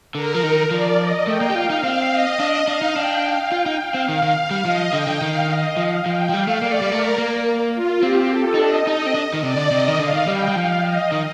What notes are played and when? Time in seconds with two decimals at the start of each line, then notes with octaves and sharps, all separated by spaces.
0.15 D3 A#4
0.34 F3
0.43 D#3
0.71 F3 D5
0.99 D#5
1.27 A3 G5
1.41 A#3
1.50 G4
1.55 F4 F5
1.70 D#4
1.83 C4 F5
2.11 D#5
2.40 D4
2.68 D4 F5
2.82 D#4
2.96 D4 G5
3.24 F5
3.52 F4 G5
3.66 D#4
3.80 F5
3.94 C4
4.08 D#3 F5
4.23 D#3
4.36 F5
4.51 G3
4.65 F3 D#5
4.93 D3 G5
5.07 D3
5.21 D#3 F5
5.49 D#5
5.77 F3 F5
6.05 F3 G5
6.29 F3
6.33 G3 F5
6.47 A3
6.61 A#3 D5
6.71 A3
6.81 G3
6.90 A3 A#4
7.18 A#3
7.74 F4
8.02 C4 G4
8.30 A4
8.54 D#4
8.58 D4 D#5
8.87 D#4 D#5
9.06 C4
9.15 D4
9.34 D#3
9.43 C3 D5
9.58 D3
9.71 C3 D#5
9.88 D#3
9.99 D3 F5
10.13 D#3
10.27 G3 G5
10.48 G3
10.56 F3 F5
10.84 D#5
11.12 D#3